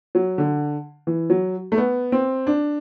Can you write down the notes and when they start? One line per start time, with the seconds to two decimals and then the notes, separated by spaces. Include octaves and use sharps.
0.15 F#3
0.38 D3
1.07 E3
1.30 F#3
1.72 A3
1.77 B3
2.12 C4
2.47 D4